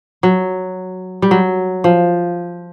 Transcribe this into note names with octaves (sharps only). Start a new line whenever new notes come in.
F#3
G3
F#3
F3